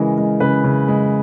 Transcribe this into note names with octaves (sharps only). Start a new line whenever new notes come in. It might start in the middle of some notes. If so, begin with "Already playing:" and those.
Already playing: C#3 E3 G#3 A#4
G#3
C#3 B4
C#3
G#3